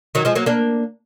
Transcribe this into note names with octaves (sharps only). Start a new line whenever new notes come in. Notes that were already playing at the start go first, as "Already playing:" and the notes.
D#3 F#3
F3 G#3
F#3 A#3
A#3 D4